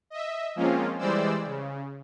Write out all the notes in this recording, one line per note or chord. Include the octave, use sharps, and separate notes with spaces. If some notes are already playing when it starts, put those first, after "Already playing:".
D#5 E5
F3 G#3 A#3 C4 C#4 F4
E3 G3 G#3 C5 D5 E6
C#3